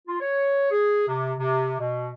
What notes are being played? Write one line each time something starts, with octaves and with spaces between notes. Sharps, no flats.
F4
C#5
G#4
C3
C3
B2